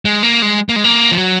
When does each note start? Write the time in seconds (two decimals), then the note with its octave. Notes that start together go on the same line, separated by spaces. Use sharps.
0.05 G#3
0.23 A#3
0.42 G#3
0.69 A#3
0.76 G#3
0.84 A#3
1.12 F3
1.17 F#3